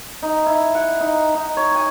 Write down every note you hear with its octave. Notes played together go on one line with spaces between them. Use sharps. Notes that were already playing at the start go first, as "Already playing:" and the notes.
D#4
E4
F#5
D#4
D#4
C#5
G#5